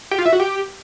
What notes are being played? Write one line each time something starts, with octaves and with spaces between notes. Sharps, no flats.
G4
F4
E5
F#4
G4